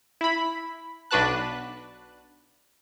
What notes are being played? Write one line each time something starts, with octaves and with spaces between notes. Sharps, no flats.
E4 B5
B1 D4 F#4 B4 A5 F#6